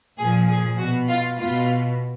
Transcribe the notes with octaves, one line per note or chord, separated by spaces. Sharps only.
A#2 F3 G#4
G#4
B2 F#4
F4
B2 F4